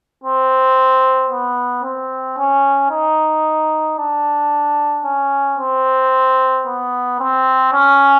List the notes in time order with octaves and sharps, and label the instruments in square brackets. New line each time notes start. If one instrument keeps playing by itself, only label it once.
[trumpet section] C4
B3
C4
C#4
D#4
D4
C#4
C4
B3
C4
C#4